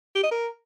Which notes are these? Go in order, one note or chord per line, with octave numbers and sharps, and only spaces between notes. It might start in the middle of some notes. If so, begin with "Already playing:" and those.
G4
D#5
A#4